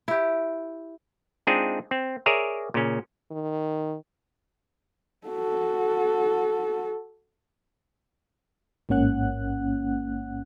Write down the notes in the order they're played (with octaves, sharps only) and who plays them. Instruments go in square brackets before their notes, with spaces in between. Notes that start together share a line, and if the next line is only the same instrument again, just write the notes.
[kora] E4 G4
[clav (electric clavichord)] G#3 C4 D4 D#4 F4 G#4
C4
G#4 A#4 C#5 D5 E5 A#5
A#2 C#3 C#4
[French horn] D#3
[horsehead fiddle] F#4 A4
[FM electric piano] A1 G#2 A#3 C#4 F#5 F#6